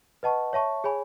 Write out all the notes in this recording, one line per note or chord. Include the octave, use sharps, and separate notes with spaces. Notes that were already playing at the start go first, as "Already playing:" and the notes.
B4 D#5 F#5 A5 C#6
C#5 E5 A5 C#6
G#4 C#5 G#5 B5